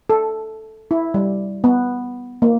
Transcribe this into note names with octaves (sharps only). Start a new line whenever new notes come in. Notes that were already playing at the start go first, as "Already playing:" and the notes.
A4
E4
G3
B3
A#3